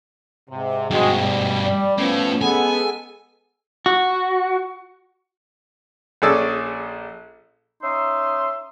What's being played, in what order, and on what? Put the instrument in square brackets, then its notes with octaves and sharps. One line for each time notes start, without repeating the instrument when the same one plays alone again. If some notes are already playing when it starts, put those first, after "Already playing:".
[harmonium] G#2 [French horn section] C3
[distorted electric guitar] G2 B2 [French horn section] G#3 F#4 [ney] G5
[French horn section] G3
[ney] D5
[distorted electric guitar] A2 [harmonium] F3 B3 [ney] C#4
[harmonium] G#3 A4 [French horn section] B3 [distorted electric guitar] G#5
[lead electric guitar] F#4
[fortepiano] A#1 C#4 G#4 A4 D5 E6
[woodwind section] C#4 D#4 E5 C6